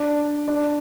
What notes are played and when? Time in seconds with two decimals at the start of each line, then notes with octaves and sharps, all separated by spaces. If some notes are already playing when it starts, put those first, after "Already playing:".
Already playing: D4
0.48 D4